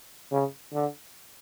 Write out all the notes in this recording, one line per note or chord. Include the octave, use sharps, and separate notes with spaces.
C#3
D3